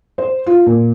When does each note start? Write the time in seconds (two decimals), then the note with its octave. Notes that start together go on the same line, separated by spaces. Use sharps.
0.18 C5
0.46 F4
0.66 A#2